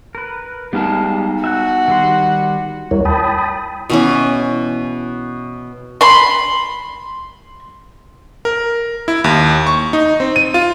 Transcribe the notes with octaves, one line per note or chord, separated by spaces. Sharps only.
A#4 B4
G3 G#3 B3 D#4 F5 A5
F#4 E5 F#5 F#6
D#3 G3 C6
D#2 G3 E4 A#4 C#5
G5 A5 B5 D#6
B2 E3 C#4
B5 C6
A#4
E4
D#2
C#6
D#4
C4
D#7
F4